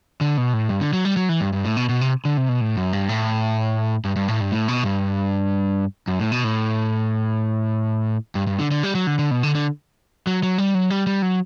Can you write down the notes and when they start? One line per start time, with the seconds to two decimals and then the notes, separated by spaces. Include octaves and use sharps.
0.21 D3
0.38 B2
0.53 A2
0.69 G2
0.81 D3
0.93 F#3
1.05 G3
1.17 F#3
1.29 E3
1.41 G2
1.53 G2
1.65 A2
1.77 B2
1.89 B2
2.01 C3
2.25 D3
2.37 C3
2.49 B2
2.61 A2
2.77 F#2
2.93 G2
3.09 A2
4.05 G2
4.16 G2
4.28 A2
4.41 G2
4.52 A2
4.68 B2
4.84 G2
6.08 F#2
6.20 A2
6.32 B2
6.44 A2
8.35 G2
8.47 G2
8.59 D3
8.71 D3
8.83 G3
8.95 F#3
9.07 D3
9.19 D3
9.31 B2
9.43 D3
9.55 D3
10.27 F#3
10.43 F#3
10.58 G3
10.74 F#3
10.90 G3
11.07 G3
11.22 F#3